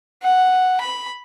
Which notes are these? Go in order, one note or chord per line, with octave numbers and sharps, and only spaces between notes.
F#5
B5